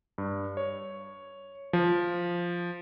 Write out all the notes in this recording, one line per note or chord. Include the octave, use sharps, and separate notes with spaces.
G2
C#5
F3